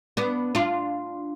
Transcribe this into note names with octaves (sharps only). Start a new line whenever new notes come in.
B3 D4
D4 F4